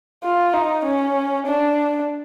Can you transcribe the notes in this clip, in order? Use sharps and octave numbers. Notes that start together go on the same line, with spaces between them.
F4
D#4
C#4
D4